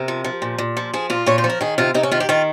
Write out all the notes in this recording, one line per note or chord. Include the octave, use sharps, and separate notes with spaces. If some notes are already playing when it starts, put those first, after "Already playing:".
Already playing: C3 A#4
F3
F3
A#2
A#2
F3
F3 G#4
A#2 F4
A#2 C#5
C5
F3
A#4
D#3 G#4
C3 F4
C3 D#4
C#4
D#3 F4
G4
D#3 F4